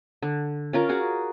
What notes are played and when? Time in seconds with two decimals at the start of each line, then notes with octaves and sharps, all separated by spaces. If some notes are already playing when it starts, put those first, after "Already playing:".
0.22 D3
0.73 C#4 F4 A#4 D5
0.89 F#4 G#4 D5